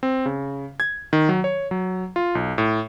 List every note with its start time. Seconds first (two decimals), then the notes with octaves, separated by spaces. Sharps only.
0.03 C4
0.26 C#3
0.80 G#6
1.13 D#3
1.29 F#3
1.44 C#5
1.71 F#3
2.16 F4
2.35 B1
2.58 A2